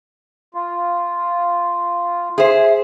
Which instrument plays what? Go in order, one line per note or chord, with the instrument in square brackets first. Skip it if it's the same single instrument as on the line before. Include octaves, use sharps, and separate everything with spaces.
[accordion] F4
[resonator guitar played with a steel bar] G#4 C5 [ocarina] E5